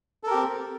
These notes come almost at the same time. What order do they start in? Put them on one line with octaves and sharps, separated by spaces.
A4 A#4 G4 C4